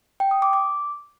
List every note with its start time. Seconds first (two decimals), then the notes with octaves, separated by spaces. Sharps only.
0.20 G5
0.31 D#6
0.42 D6
0.53 D6